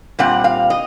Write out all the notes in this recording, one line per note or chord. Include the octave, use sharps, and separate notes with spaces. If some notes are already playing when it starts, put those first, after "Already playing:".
A#2 G3 C4 F#5
F5
D#5